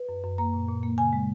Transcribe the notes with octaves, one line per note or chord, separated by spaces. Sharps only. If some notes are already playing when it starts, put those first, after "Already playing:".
Already playing: B4
F#2
F#2
A#3 A#5
A#2
A#2
A#3
C#3 G#5
G#3